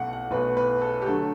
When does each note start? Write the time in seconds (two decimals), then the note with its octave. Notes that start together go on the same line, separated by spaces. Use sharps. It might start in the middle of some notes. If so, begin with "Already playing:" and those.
Already playing: B1 B2 A3 F#5
0.13 F#5
0.31 B1 B2 A3 B4
0.57 B4
0.82 A4
1.02 G4
1.06 D3 F#3 A3 A4